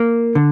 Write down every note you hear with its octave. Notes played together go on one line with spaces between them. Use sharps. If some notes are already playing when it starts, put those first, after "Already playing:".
Already playing: A#3
D3